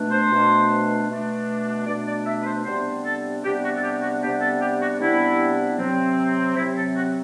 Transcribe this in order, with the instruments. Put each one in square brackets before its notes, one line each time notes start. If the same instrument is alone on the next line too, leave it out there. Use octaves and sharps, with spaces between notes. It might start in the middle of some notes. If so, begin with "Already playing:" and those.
Already playing: [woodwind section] B2 A3 D4
C5
B2 A3 D4
B2 A3 D4
B2 A3 D4 D5
D5
E5
B4
C5
C3 G3 B3 D4 C5
A4
C3 G3 B3 D4 G4
F#4
A4
G4
F#4
C3 G3 B3 D4 G4
A4
G4
F#4
C3 G3 B3 D4 E4
C3 F#3 C4
C3 F#3 C4 E4
A4
F#4